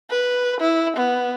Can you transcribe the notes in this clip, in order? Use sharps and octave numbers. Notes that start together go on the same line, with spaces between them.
B4
E4
B3